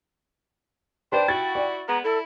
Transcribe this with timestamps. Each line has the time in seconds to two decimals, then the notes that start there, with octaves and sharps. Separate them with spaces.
1.12 D4 B4 C5 D5 G5
1.28 E4 F#4 A6
1.55 D5
1.88 G#3 B3 A#5
2.04 E4 A4